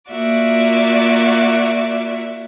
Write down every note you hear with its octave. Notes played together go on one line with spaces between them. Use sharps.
A#3 F4 F#4 D5 E5